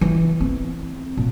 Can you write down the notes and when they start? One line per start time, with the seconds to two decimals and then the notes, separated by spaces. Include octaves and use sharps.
0.01 E3
0.40 C4
1.17 A#2